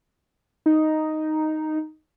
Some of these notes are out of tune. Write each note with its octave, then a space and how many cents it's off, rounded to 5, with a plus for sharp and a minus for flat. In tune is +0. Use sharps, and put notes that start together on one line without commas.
D#4 +0